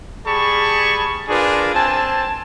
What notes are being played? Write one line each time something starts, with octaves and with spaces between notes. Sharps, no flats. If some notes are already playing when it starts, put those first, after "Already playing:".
G3 G#4 A5 B5 C#6
D4 F4 G#4 A#4 B4
C4 G#5 A5